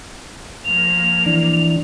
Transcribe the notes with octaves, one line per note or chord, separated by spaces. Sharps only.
F3 A#3 F7
E3 D4